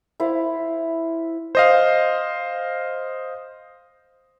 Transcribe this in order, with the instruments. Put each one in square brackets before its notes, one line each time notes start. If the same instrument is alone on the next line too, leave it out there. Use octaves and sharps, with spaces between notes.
[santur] E4 C5 D5 F5
[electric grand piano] C5 D#5 F5